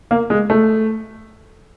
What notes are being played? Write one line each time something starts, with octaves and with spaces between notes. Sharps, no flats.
A#3
G#3
A3